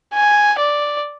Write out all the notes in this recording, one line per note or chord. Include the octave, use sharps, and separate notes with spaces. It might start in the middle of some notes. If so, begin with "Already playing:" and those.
G#5
D5